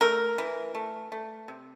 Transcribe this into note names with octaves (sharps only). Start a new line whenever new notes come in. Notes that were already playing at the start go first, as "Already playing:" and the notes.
A3 A#4
E3
A3
A3
C3